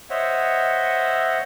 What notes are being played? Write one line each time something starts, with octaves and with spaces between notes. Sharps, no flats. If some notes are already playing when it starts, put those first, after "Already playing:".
C5 C#5 D#5 E5 F#5